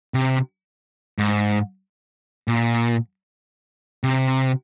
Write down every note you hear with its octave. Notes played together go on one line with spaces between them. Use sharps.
C3
G#2
A#2
C3